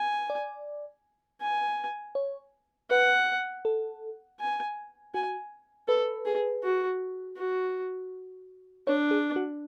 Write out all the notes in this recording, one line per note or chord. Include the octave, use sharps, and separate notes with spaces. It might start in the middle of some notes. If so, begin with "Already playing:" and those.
Already playing: G#5
D5
G#5
C#5
B4 F#5
A4
G#5
F#4 G#5
A4 B4
G#4
F#4
F#4
D4 C#5
G#4
F#4